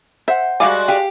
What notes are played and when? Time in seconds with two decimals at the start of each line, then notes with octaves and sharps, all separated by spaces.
0.28 C5 E5 F#5
0.60 G3 G#3 F#4 D5 F5 G#5
0.88 G4 G#4 F5